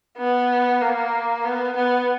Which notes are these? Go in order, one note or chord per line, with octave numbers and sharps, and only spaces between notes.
B3
A#3
B3
B3